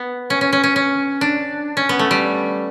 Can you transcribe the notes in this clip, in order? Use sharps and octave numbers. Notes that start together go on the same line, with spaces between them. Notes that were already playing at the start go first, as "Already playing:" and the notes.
Already playing: B3
C#4
C#4
C#4
C#4
C#4
D4
C#4
B3
A3
G3